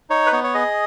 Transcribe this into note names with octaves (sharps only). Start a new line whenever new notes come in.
D#4 C#5
B4
B3 C#5
C#5
G#4 D#5